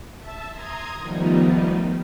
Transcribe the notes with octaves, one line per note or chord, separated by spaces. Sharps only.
E5 A5 E6
A#5 C6 D#6 G#6
D#3 F3 G3 A3 B3 D#4